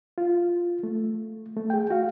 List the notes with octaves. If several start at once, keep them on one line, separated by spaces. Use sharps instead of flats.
F4
A3
A3
G#4 G5
F#4 F5